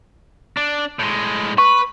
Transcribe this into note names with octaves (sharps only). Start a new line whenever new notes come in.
D4
A2 G#3
B4 C#6